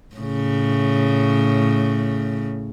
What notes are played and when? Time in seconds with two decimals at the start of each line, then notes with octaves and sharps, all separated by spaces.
0.16 A2 C#3